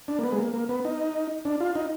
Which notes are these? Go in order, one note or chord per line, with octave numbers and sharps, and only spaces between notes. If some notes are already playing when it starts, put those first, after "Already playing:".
D4
A#3
B3
G#3
A#3
A#3
B3
D#4
D4
F4
D#4